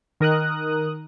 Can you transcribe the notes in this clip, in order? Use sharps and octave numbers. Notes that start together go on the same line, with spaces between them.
D#3 A#4 D#6 F#6